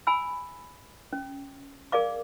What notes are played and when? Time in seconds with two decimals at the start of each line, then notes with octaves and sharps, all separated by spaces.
0.07 G#5 B5 E6
1.13 C#4
1.92 G#4 A#4 D5 F5 D6